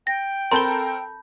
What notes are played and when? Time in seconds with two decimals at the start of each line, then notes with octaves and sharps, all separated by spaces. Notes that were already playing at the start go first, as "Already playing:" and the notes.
0.07 G5 A#6
0.52 C4 A4 A#4 A5 B5 C6 G6 G7